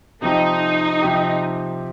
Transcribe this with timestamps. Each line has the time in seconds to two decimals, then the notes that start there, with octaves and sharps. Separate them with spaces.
0.22 C3 F3 C4 D#4 G4
1.02 C3 F3 C4 G4